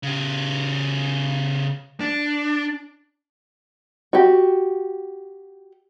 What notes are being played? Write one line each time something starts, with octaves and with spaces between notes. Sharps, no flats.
C#3 G4
D4
F#4 G4